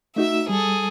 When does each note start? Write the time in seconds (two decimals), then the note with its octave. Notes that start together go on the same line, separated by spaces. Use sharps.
0.16 A3 D#4 F#4 E5 E6
0.49 G3 G#4 A4